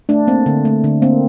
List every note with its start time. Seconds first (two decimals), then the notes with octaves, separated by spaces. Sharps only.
0.09 A3 D4
0.27 A#3 C4
0.46 D3
0.65 A3
0.84 D3
1.02 A#3 C4